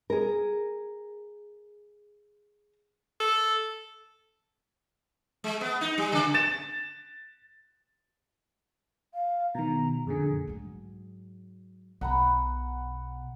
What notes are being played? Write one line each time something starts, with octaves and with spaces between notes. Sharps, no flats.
G#4 A#4
A4
G#3
B3
D#4
G3
C#3
A6 E7
F5
B2 D#3 A#5
F2 A#2 D3 G#4
G#2 F#3
B1 B2 F#5 A#5 B5